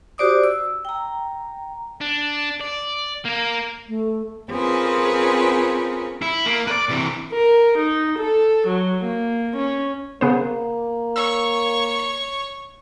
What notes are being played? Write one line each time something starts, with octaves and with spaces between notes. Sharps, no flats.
F#4 G4 C5 D5 D6 D#6
E6
G5 A#5
D4
D5
A#3 A#4
A3
C4 C#4 F4 G#4 A#4 B4
E4
A#3
B4 D5
C3 E3
A#4
D#4
A4
F#3
A#3
C#4
C#3 A#3 B3 C5
C#5 C#6 E6